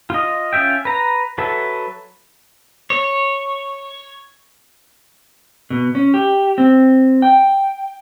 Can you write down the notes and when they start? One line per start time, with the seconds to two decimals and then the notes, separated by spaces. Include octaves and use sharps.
0.10 F4 D#5
0.53 C#4 F4 E5 G5
0.85 B4 A#5
1.38 F#3 A4 B4 E5
2.90 C#5
5.70 B2
5.95 C#4
6.14 G4
6.58 C4
7.22 G5